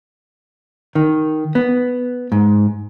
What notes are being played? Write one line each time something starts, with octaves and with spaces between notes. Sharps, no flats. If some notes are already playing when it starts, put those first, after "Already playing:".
D#3
B3
G#2